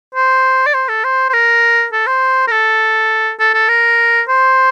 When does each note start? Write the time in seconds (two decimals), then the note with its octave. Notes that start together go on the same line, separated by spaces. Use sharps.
0.15 C5
0.66 D5
0.74 C5
0.89 A4
1.04 C5
1.29 C5
1.33 A#4
1.93 A4
2.07 C5
2.47 A#4
2.51 A4
3.40 A4
3.54 A4
3.68 A#4
4.28 C5